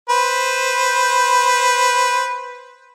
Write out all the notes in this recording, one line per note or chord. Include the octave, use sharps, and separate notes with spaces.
B4 C5